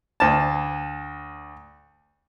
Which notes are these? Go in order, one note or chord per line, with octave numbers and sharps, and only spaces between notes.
D2 A5